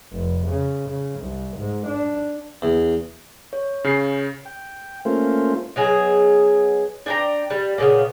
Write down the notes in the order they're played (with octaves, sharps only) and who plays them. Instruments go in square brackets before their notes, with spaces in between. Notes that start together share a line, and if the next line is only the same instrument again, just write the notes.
[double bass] F1
C#3
C#3
C2
G#2
D4
[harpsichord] E2
[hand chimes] C#5
[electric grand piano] C#3 C7
[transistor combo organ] G5
A3 A#3 C#4 F4 C5
[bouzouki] B2 F#3 G#4
D4 G5 A#5
G3
A#2 C#3 B3